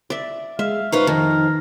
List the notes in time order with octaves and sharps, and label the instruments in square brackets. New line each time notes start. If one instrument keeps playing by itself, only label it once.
[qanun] D5 E5
[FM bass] G#3 [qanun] E5 [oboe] F5
[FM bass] D#4 [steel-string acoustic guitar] F4 B4 C5 [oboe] C#6
[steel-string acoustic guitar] F2 [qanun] D#3 [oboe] A#4